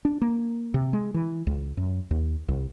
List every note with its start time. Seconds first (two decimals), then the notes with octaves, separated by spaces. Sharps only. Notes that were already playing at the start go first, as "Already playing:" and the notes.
0.05 D4
0.22 A#3
0.74 C3
0.93 G#3
1.14 E3
1.47 C#2
1.77 F#2
2.11 D#2
2.48 C2